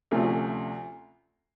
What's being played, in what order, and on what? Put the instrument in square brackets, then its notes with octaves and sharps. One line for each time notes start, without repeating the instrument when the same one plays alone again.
[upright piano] D2 C3 F3 A3 C#4